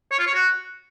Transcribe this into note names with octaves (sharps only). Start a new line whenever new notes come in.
C#5
F4
C#5
F#4